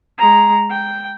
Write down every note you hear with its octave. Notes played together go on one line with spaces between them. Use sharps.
G#3 A#5
G5